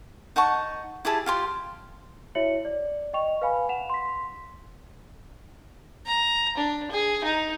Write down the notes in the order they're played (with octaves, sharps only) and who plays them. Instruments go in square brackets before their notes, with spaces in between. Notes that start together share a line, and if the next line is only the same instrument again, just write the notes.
[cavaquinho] D#4 F#5 A5 C#6
E4 G4 G#4 A5
F4 G4 C6
[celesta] E4 F#4 C#5 E5 C#7 F#7
D5
D#5 G5 C#6 F7
B4 F5 G#5 B5
F#5 E7 F7
C6 B6
[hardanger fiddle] A#5
D4
G#4
D#4